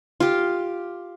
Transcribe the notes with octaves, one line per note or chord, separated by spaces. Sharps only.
F4 G4